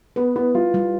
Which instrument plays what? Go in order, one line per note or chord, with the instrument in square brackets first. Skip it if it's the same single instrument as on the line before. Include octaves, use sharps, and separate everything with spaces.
[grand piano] B3 [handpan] B4
[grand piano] B3 [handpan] E4
[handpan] G3 [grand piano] F4
[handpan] G3